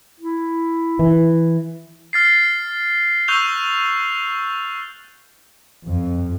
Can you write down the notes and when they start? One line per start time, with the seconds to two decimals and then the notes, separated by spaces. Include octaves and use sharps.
0.20 E4
0.99 E3
2.13 F6 A6 C7
3.28 C#6 E6 F#6 G6 F7 G7
5.83 F2